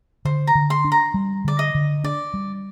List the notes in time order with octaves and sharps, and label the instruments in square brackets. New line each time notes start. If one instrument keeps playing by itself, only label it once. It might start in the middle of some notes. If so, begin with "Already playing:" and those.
[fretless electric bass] D3 [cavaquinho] C5
[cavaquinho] A#5
[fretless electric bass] D3
[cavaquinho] C6
[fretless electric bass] D4
[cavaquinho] A#5
[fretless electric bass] G3
[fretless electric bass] D3 [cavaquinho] D5
[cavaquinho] D#5
[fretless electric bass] D3
[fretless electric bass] D4 [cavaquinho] D5
[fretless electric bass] G3